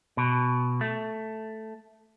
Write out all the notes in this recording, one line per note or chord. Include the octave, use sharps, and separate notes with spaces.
B2
A3